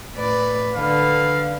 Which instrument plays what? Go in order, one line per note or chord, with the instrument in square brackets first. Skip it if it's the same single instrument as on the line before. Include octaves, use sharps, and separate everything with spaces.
[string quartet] A2 B4 D5
[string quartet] D3 A4 B4 [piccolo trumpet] F5